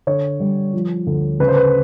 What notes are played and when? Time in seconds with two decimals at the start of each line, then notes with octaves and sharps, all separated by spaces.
0.07 D3 C#5
0.40 G3
0.73 F3
1.07 D2
1.40 C#3 B4
1.48 C5
1.56 B4